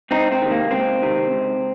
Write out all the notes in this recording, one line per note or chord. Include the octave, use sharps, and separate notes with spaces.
C#2 C4 D#4
C4
C3 D#3
A#3
C#2 C4
C3 D#3
C#2